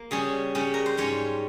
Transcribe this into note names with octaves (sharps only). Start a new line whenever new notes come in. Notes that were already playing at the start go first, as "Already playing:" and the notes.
Already playing: A#3
C#3 G3 C#4 G#4
C#3 G3 C#4
A#4
C5
G#2 G3 C#4 C#5